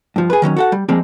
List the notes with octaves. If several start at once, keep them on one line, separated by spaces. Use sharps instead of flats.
G2 F3
G#4 B4
D#3 F#3 A#3 C#4
F#4 A4 F#5
G3
F3 G3 G#3 A#3 C4